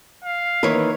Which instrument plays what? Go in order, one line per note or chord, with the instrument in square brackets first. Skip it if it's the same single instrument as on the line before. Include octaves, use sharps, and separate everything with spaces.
[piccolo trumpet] F5
[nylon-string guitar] D#3 E3 A#3 [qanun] B4 C#5